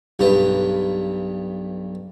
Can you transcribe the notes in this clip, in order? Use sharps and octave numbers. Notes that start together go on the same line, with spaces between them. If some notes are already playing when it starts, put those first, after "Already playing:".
B1 G2 G3 B4